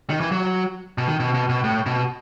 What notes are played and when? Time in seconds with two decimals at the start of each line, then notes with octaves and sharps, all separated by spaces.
0.10 D#3
0.20 E3
0.32 F#3
0.98 B2
1.08 D#3
1.20 B2
1.34 B2
1.49 B2
1.64 A2
1.86 B2